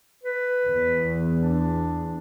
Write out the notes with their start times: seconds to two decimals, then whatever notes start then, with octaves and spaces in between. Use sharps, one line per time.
0.24 B4
0.69 E2
1.40 D4